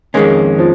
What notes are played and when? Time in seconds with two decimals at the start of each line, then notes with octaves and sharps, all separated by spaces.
0.14 F2 D#3 G#3 A#3 C#4
0.59 F3